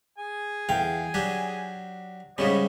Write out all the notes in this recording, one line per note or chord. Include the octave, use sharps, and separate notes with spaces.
G#4 G#5
E2 F5 G5
F#3 D4 G4
G#2 C#3 G3 C#4 C#5 D#5 B5